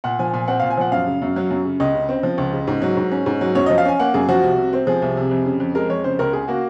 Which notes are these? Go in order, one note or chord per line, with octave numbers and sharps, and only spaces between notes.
A#2 F#5
F3 G#5
A#2 G#5
C4 F#5
F5
A#2
G#5
F3 F#5
F#2 F5
C#3
F#2
F#3
F#2
C#3
C#2 D#5
C#3
C4
F3
C#2
C#3
G#2
F#3
G#2
C#4
G#2
F#3
F#2 C#5
D#5
F3
F5
C#4 G#5
A#3 F#5
F#2 G#4
F3 F#4
C2
C3
C4
F3 G#4
C2
C3
F2
C#3
F2
G#3 A#4
F2 C#5
C#3 C5
C#2 A#4
C#3 G#4
A#3 F#4